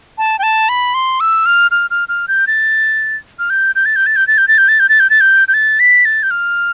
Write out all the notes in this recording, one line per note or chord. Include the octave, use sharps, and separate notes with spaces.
A5
G5
A5
B5
C6
E6
F6
F6
F6
F6
G6
A6
F6
G6
G6
A6
G6
A6
G6
A6
G6
A6
G6
A6
G6
A6
G6
A6
G6
G6
A6
B6
A6
G6
F6